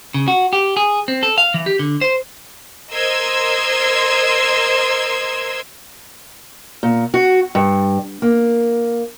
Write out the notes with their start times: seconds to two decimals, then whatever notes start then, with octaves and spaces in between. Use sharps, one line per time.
0.14 C#3
0.28 F#4
0.53 G4
0.77 G#4
1.08 C4
1.23 A4
1.38 F5
1.54 E3
1.66 G4
1.79 D3
2.01 C5
2.92 A#4 C5 D#5 C6 E6 G#6
6.83 A#2
7.14 F#4
7.55 G2
8.22 A#3